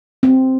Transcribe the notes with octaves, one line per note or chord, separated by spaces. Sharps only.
C4